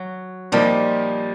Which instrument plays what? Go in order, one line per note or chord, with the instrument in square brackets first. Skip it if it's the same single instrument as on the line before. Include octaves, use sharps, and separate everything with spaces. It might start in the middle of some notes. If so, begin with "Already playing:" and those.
Already playing: [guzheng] F#3
[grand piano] A#2 F3 A#3 D#4 [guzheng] G3